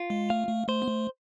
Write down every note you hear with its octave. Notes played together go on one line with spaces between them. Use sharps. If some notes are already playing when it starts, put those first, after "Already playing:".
Already playing: F4
G#3
A3 F5
A3
A3 C5
B3
A3